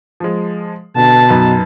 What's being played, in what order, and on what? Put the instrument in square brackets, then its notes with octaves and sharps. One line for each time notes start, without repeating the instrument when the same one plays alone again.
[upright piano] F3 G#3
[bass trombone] B2 [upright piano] D3 [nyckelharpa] A5
[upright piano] F#2 D#4 B4